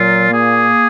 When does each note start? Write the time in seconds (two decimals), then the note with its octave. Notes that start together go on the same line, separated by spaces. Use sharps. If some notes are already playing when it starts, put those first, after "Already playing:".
Already playing: A#2 F#3 F4
0.30 A#3 G#4